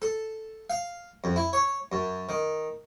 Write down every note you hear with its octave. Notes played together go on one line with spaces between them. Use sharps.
A4
F5
F2
E4
C#5
F#2
D#3